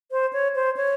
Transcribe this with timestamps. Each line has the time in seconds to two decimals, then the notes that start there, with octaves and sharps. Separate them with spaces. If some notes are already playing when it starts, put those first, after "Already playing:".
0.11 C5
0.33 C#5
0.55 C5
0.77 C#5